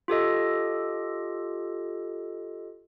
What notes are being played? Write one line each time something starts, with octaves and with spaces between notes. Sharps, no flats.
F4 G4 A4 D#5